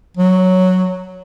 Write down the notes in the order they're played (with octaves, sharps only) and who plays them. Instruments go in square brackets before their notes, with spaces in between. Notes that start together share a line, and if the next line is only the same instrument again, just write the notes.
[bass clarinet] F#3